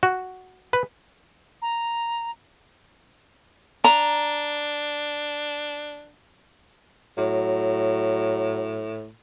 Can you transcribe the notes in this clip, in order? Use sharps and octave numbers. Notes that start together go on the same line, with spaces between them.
F#4
B4
A#5
D4 A#5
A2 F#3